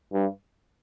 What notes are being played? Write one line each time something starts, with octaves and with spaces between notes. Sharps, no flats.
G2